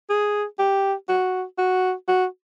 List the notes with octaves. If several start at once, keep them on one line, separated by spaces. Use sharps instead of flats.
G#4
G4
F#4
F#4
F#4